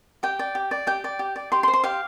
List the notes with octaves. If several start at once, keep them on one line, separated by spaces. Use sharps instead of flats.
G4 G5
D5
G4
D5
G4 G5
D5
G4
D5
G4 C6
C6
C5
C6
G4 F5